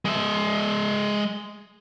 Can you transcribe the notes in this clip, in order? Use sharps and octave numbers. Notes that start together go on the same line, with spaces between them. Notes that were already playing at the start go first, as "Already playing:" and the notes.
G#3 E5